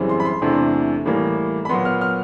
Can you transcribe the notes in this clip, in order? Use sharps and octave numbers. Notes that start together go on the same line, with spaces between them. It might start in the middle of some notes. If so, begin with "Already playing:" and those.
Already playing: F#2 C#3 E3 G3 C4
C6
B5
C6
E2 C3 E3 A3 D4
A2 E3 G3 A#3
B5
A#2 F#3 B3 C6
F6
F6